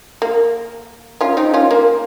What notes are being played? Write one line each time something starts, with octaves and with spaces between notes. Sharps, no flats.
A#3
C#4 F4
C4 D#4
C#4 F4
A#3